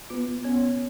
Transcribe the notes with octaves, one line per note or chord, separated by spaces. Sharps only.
B3 F4 B4
B3 C#4 C#5